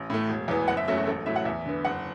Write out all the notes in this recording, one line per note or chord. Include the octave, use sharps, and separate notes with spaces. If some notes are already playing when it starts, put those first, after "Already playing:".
Already playing: A1
A2 A3
E1
E2 E3 B3
F#1 F#5
E5
F#2 F#3 A3 E5
F#4
A1 A4
A2 F#3 A3 E5
F#5
E2 E5
D3 B3
F#1 F#5